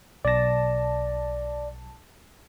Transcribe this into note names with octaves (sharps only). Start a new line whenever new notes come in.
B1 D5 A5 A#6